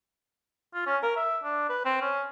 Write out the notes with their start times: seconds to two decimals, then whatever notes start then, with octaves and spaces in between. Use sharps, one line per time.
0.74 F4
0.86 C#4
1.03 A#4
1.16 E5
1.43 D4
1.69 B4
1.85 C4
2.01 C#4